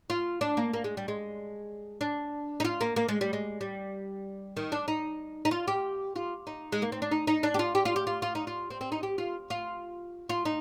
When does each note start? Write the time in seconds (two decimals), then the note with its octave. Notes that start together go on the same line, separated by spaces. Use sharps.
0.10 F4
0.41 D4
0.57 A#3
0.74 A#3
0.84 G#3
0.97 G3
1.08 G#3
2.01 D4
2.60 D#4
2.65 F4
2.81 A#3
2.96 A#3
3.09 G#3
3.21 G3
3.33 G#3
3.61 G3
4.57 D#3
4.72 D4
4.88 D#4
5.45 D#4
5.51 F4
5.68 G4
6.16 F4
6.47 D#4
6.72 G#3
6.82 A#3
6.92 C4
7.02 D4
7.11 D#4
7.27 D#4
7.43 D4
7.54 G4
7.59 F4
7.75 G4
7.85 F4
7.96 G4
8.07 F4
8.22 F4
8.35 D#4
8.47 F4
8.70 C4
8.81 C4
8.92 D#4
9.03 G4
9.18 F4
9.50 F4
10.29 F4
10.45 D#4